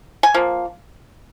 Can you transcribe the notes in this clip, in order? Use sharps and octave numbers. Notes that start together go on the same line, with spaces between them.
G#5
F3 A#3